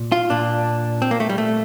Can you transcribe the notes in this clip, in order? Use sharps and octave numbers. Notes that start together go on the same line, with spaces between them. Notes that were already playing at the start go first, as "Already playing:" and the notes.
Already playing: A#2
F4
A#2 D4
C4
A#3
A3
G3
A3